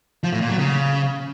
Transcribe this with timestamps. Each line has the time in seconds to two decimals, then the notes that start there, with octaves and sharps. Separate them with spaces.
0.23 F3
0.32 A2
0.41 A#2
0.50 F#3
0.59 C#3